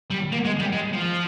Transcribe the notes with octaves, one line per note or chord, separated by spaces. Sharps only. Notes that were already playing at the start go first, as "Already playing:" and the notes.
G3
A#3
G#3
G3
G#3
F3